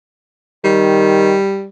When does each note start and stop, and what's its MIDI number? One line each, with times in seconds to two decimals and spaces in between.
0.64 1.35 51
0.64 1.68 55